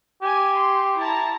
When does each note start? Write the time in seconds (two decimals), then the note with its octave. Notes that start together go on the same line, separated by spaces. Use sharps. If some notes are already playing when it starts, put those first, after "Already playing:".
0.22 G4 G#5
0.58 C6
0.97 E4 A5 A#5